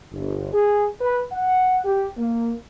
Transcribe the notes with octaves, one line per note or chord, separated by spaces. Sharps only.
G1
G#4
B4
F#5
G4
A#3